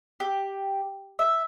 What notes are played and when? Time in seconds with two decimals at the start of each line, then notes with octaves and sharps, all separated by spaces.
0.20 G4
1.19 E5